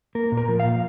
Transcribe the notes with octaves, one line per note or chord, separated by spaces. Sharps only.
A#3 A#4
A#2
A#4
F3
F5
A#2